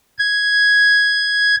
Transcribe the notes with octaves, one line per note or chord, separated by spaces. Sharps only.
G#6